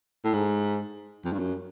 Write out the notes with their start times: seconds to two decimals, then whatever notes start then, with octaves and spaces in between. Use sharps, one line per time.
0.24 A2
0.34 G#2
1.25 F2
1.33 G2
1.39 F#2